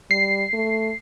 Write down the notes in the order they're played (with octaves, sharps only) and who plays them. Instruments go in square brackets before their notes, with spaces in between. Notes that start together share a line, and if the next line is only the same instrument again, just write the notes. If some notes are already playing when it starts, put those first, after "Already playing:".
[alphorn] G3 [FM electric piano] C7
[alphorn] A3